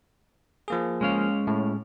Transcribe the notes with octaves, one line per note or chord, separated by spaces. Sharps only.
F3 A#3 G#4
G#3 C#4 F5
A2